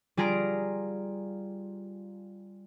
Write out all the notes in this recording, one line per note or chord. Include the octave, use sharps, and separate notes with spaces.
G3 F4 G#4 A#5 F6 D7